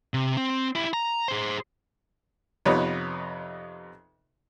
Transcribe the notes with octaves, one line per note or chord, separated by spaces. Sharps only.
C3
C4
E4 G4
A#5
G#4 C5
F2 C3 B3 D#4 B4 C#5